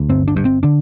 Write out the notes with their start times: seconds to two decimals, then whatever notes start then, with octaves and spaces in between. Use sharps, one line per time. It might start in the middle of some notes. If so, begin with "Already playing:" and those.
Already playing: D2
0.09 G1 C4
0.28 D4
0.36 G2
0.45 C4
0.63 D3 D4